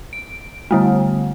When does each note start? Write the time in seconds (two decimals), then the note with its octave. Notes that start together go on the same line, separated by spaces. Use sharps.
0.13 D7
0.71 D3 G3 A3